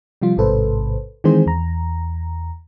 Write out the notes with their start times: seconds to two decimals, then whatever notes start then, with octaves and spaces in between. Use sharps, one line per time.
0.22 C3 F3 G3 F4
0.37 A1 G#2 C3 A4 B4 C5
1.24 D#3 E3 G#3 C4 G#4 C5
1.46 E2 A#5